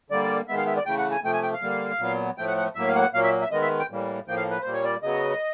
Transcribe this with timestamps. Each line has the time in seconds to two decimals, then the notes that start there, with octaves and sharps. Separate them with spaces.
0.10 D3 G3 A#3 D5
0.48 D#3 G#3 B3 E5
0.57 F5
0.67 E5
0.77 D5
0.86 C#3 E3 A3 G5
0.98 F#5
1.11 G#5
1.24 C3 F3 A3 G5
1.33 G#5
1.43 G5
1.53 F5
1.62 D3 G3 A#3
1.99 A#2 F#3 B3
2.38 A2 F3 A3 G5
2.47 F#5
2.57 F#5
2.75 A2 F#3 A#3 E5
2.87 F5
2.95 F#5
3.14 A#2 F#3 A#3 F5
3.23 E5
3.42 E5
3.51 D#3 G#3 B3 D#5
3.62 E5
3.80 G5
3.90 A2 E3 G3 A#3
4.28 A2 F3 A#3 G5
4.37 F5
4.50 B4
4.61 A#2 G3 A#3 C5
4.73 C#5
4.84 D5
5.03 C#3 F#3 B3 D#5